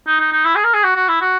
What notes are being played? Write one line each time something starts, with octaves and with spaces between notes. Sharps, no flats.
D#4
D#4
D#4
E4
G#4
A#4
G#4
F#4
F#4
E4
F#4